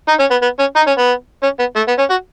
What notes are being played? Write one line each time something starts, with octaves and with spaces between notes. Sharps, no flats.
D#4
C#4
B3
B3
C#4
D#4
C#4
B3
C#4
B3
A3
B3
C#4
F#4